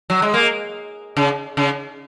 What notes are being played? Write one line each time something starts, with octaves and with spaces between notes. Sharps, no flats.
F#3
G#3
A#3
C#3
C#3